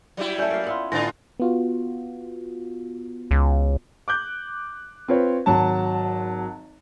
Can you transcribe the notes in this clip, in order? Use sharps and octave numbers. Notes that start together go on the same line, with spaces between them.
F#3 G3 E4 D5
A3 C#4 D5 G6
A#3 F5
B3 E4 F4
A2 D3 B3 F4 G#5 C6 A#6
B3 F4 F#4
C#2
D6 F#6 G6
C4 F4 B4 C#5
G#1 F#3 A5